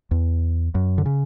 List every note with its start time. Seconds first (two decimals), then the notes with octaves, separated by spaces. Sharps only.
0.11 E2
0.75 F#2
0.98 D3
1.06 C#3